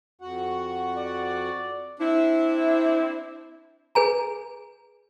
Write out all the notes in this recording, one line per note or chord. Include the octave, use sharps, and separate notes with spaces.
F2 F#4 F#5
D5
C4 D4 E4
G#4 B4 G#5 A#5